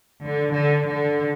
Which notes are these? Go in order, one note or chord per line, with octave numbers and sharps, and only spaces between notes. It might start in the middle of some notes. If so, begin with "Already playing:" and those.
D3
D3
D3